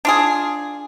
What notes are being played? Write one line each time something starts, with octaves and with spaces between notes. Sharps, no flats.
D4 F4 G#4